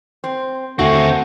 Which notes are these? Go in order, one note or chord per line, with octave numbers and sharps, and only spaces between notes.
C4
D#2 D3 A3 C4 C#4 F#4 A#6